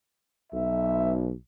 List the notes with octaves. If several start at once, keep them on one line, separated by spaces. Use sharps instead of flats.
B1 E5